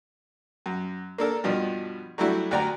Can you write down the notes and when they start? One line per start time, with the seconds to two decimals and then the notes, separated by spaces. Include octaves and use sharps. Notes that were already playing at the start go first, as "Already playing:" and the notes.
0.66 F#2
1.18 A#3 D4 A4 A#4
1.44 G2 B2 F3 D4
2.18 F#3 G3 A3 D4 E4 F#4
2.51 D2 F#4 D5 G5 A#5